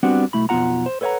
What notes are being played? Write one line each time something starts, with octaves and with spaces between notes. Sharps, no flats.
G3 B3 C4 D4 F#4 F#5
B1 A3 E4 B5
B1 F2 B3 F4 F#5 A#5
C5
A4 B4 C#5 E5 F#5 A#5